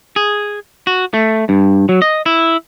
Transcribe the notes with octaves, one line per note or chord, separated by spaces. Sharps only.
G#4
F#4
A3
G2
F#3
D#5
E4